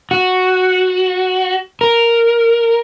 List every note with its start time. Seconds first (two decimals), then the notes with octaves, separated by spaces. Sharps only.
0.11 F#4
1.81 A#4